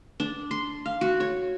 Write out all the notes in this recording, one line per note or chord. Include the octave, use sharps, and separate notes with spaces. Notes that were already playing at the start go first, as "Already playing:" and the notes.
D4
C6
F5
F#4
C#5